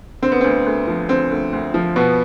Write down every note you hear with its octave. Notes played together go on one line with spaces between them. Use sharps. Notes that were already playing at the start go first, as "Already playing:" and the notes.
D3 C4
B3
D2 C4
D2
F3
D3 C4
D2
D2
F3
B2 B3